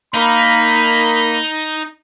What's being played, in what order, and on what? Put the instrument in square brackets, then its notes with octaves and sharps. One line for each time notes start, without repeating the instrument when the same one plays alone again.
[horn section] A#3 B5 [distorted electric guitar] D#4